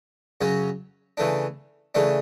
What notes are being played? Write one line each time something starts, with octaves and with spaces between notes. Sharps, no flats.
F#2 C#3 F#3 C#4
C#3 E3 A3 D4
C#3 E3 A3 D4